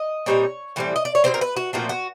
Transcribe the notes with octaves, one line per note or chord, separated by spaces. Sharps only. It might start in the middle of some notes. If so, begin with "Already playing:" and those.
Already playing: D#5
A#2 G3 C4 D#4 C#5
A2 E3 G3 C4
D#5
D5
C#5
B2 G3 C4 C5
A#4
B4
F#4
A#2 F3 A3 C4 F#4
F#4